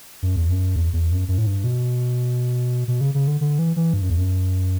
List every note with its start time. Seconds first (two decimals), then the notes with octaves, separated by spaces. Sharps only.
0.22 F#2
0.36 E2
0.49 F#2
0.76 E2
0.93 E2
1.11 F#2
1.28 F#2
1.38 A2
1.47 G2
1.64 B2
2.88 B2
3.01 C#3
3.14 C#3
3.27 D3
3.41 D3
3.59 E3
3.76 E3
3.93 G2
4.02 F#2
4.10 E2
4.18 F#2